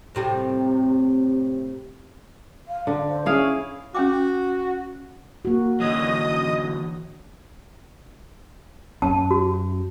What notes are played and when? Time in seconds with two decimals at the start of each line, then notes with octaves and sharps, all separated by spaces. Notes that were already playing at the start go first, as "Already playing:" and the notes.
0.15 A2 C3 G3
2.68 F5
2.87 D3
3.09 C5
3.26 C#4 E4 G#4 F5
3.95 C#4 F#4 G5 D6
5.45 A#3 F#4
5.80 D3 E3 F#3 D#5 D#6
9.02 F#2 C#4 A5
9.31 F#4